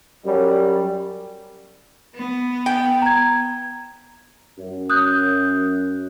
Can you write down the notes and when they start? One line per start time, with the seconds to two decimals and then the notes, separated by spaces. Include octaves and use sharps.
0.25 F#2 G3
2.15 B3
2.66 G5
3.02 A#5 G#6
4.58 F#2
4.90 D#6 F#6 G6